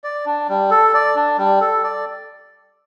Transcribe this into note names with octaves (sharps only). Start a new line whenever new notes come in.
D5
D4
G3
A4
D5
D4
G3
A4
D5